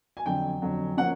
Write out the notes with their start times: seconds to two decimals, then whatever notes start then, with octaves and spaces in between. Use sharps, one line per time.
0.17 G#5
0.26 F2 D3 F#3 G5
0.62 F2 D3 F#3
0.97 F3 A#3 C#4 F#5